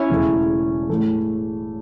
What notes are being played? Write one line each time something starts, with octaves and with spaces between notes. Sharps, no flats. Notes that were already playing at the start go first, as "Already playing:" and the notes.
Already playing: C#4 E4
E1 E2 C#3 E3 A3
A2 E3 A3